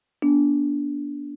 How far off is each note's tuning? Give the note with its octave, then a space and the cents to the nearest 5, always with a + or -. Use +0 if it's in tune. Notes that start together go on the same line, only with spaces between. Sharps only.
B3 -40 D4 -25